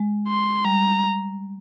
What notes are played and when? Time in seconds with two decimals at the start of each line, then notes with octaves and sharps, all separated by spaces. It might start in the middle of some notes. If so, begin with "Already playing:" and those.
Already playing: G#3
0.28 C6
0.65 G3 A#5